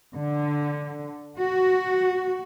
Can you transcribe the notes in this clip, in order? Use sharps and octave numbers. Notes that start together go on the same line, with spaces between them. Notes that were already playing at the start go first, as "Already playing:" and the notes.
D3
F#4